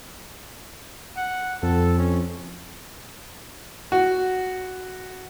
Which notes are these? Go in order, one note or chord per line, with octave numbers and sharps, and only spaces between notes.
F#5
F2 A4
C#4
F#4